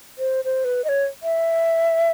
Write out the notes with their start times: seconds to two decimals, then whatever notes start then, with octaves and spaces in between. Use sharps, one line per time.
0.18 C5
0.45 C5
0.65 B4
0.84 D#5
0.89 C#5
1.23 E5